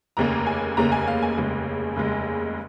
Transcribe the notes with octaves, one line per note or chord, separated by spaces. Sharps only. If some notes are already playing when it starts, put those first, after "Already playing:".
F1 D#2 C#3 A#3 A#5
G#5
F1 D#2 C#3 A#3 A#5
G#5
F5
G#5
F1 D#2 C#3 G#3
F1 D#2 C#3 G#3